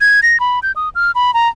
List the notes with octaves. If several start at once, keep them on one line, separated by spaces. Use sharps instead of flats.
G#6
A#6
B5
G6
D#6
F6
B5
A#5